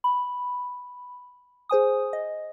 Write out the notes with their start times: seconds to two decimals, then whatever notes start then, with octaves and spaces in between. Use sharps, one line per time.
0.04 B5
1.69 G#4 C5 G#5 D#6
2.13 D#5